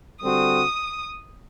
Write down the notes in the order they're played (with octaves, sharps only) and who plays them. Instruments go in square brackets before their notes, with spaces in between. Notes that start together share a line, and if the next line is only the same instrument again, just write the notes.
[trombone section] D3 G3 C4 F#4 A4 [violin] D#6